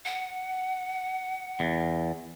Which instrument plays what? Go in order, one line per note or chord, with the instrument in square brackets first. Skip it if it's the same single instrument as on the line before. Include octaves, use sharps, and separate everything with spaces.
[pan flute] F#5
[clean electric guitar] E2